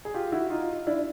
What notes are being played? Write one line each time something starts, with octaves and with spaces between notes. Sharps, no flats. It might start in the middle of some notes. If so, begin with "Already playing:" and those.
G#4
F4 G4
E4 F#4
D#4 F4
D4 E4